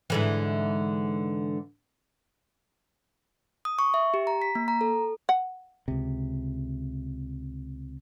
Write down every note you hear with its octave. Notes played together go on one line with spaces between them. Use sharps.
G#2 D3 E3
D#6
C#6
E5
G4
A#5
B6
A#3
A#5
A4
F#5
C#2 C3